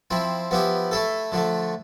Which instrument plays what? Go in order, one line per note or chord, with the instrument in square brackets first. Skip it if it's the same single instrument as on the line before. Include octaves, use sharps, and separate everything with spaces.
[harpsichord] F3 C4 E4
F3 B3 E4 G4
A3 E4 A4
D3 F3 A3